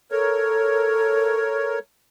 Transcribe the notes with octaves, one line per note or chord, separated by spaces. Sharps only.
A4 A#4 C#5